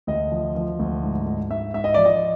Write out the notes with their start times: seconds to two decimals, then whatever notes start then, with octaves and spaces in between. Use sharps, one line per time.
0.07 D2 D#5
0.32 F3
0.55 F3
0.79 D2
1.03 G#2
1.26 G#2
1.50 G#2 E5
1.74 G#2 E5
1.84 D#5
1.94 F3 D5
2.05 D#5